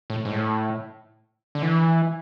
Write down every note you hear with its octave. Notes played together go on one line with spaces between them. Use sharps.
A2
G#2
A2
D3
E3